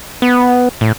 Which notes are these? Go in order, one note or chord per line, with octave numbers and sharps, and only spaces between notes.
B3
A2